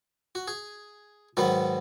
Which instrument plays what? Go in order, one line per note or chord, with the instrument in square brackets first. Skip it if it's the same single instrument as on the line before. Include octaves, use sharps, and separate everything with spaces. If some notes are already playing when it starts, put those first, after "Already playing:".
[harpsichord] F#4
G#4
G#2 D#3 F#3 B3 F#4